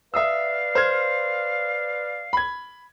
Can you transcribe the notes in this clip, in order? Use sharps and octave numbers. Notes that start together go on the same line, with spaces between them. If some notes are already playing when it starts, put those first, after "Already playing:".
B4 D5 E5 F5 D#6 E6
C5 F6 G#6
B5 G#6